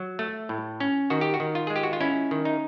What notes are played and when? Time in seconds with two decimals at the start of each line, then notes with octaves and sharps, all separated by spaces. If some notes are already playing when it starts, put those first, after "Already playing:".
Already playing: F#3
0.19 A3
0.49 A2
0.80 C#4
1.10 D#3 F#4
1.21 G4
1.34 F#4
1.40 D#3
1.55 F4
1.67 G#3 G#4
1.76 G4
1.83 F#4
1.93 F4
2.01 C#4 E4
2.31 D#3
2.45 D#4